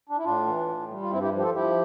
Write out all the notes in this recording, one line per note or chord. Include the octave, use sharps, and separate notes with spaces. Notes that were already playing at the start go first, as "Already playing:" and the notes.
D4
E4
A2 D4 F4
E3
A2
G3
F4
G2 C4 E4
E4 G4
F3
G4
F4 A4
F3 E4 G4